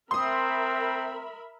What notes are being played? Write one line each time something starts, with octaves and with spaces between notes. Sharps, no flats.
C4 A#4 E5 B5 C6 D#6